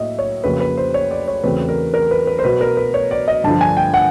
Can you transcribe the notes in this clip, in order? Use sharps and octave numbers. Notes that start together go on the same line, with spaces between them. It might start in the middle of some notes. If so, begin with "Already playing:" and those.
Already playing: A2 F#3 A#3 D#5 E5
C#5
F2 C#3 F#3 A#3 B4
B4
C5
C#5
D5
C#5
E2 C#3 F#3 A3 C4 B4
A#4
A#4
B4
B4
C5
B2 F#3 B3 B4
A#4
B4
C#5
D5
D#5
G2 D3 F3 A5
G#5
G5
F#5